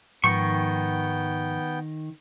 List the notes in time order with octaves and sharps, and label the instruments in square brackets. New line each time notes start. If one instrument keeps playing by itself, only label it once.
[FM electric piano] G#2 F3 [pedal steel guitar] D#3 C#6 [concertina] B3 G5